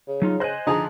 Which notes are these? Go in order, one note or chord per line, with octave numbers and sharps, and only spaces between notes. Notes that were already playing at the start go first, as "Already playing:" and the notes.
C#3
F#3 D#4 F4
C5 D#5 G#5 F#6
D3 F3 D#4 G#4